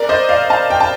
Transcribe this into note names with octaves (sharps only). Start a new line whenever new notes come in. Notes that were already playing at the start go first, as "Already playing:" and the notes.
Already playing: A#4 D5
C5 D#5
D5 F5
F5 A5
G5
A5